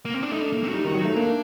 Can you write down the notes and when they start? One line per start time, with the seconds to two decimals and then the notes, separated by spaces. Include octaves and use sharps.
0.05 A#3
0.14 C4
0.23 D4
0.31 A3 D#4
0.42 D4
0.53 A#3
0.64 C4
0.69 F#4
0.74 G3 D#4
0.84 D#3
0.88 F#4
0.95 F#3
1.02 A3 D#4
1.16 A#3 D4